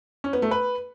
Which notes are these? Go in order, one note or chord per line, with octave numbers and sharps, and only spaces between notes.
C#4
B3
A3
B4